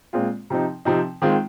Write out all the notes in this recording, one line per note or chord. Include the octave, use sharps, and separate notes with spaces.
A#2 G#3 C4 F4
C3 F3 C4 D#4
C3 F3 C4 D#4
D#3 G#3 C4 F4